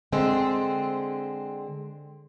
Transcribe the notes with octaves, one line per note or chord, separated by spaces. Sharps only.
D3 G#3 C4